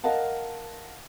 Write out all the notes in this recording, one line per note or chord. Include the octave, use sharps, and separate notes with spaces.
A#4 D#5 F5 F#5 A5